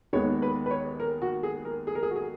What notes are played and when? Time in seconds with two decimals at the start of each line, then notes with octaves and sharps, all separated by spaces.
0.13 D#2 D#3 G#3 B3 C#5
0.42 B4
0.66 B4
0.71 C#5
1.00 A#4
1.22 F#4
1.43 G#4
1.65 A#4
1.87 G#4
1.95 A#4
2.03 G#4
2.11 F#4
2.16 G#4